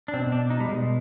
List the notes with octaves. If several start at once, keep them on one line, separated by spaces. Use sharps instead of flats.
D4
B2 C4
D4
D#4
G3
B2 G#3